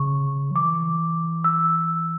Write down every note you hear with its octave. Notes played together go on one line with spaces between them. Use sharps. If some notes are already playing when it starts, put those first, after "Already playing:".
Already playing: C#3 C#6
F#3
E3 D6
E6